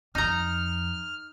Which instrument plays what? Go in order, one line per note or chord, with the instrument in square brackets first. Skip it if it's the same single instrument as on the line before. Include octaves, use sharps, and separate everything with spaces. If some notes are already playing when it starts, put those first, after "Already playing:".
[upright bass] F2 [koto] D#4 A#5 [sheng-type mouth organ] F6